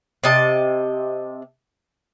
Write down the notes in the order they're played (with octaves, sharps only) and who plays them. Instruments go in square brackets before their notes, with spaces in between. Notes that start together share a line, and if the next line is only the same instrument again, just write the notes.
[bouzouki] C3 D#5 A5